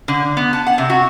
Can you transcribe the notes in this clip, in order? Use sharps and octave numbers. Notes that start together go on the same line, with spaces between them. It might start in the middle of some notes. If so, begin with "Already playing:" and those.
D3
B3
A5
F#5
C3
F#4